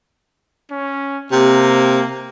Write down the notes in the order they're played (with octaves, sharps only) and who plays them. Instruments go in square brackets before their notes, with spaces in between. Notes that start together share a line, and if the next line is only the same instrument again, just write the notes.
[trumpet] C#4
[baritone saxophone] C3 [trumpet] A#3